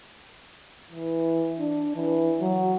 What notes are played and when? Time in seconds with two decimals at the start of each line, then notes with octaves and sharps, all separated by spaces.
0.91 E3
1.59 D4
1.96 E3
2.41 F#3